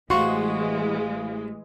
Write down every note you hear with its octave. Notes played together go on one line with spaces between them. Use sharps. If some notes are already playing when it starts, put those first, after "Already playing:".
A1 E3 G#3 F#4 C5 F5 C6 C#6